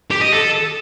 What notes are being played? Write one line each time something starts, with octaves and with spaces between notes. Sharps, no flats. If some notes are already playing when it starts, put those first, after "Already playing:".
G4
D#5
A4